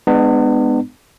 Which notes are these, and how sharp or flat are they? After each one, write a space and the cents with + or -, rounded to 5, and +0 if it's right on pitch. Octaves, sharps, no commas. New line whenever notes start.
G#3 +0 B3 +20 D4 +40